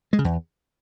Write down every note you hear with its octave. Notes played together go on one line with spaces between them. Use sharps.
G#3
C#3
E2